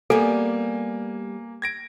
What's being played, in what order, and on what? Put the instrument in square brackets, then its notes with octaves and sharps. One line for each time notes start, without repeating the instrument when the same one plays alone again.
[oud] G3 B3 [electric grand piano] A#3 G#5 [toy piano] A4
[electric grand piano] G#6 A#6 D7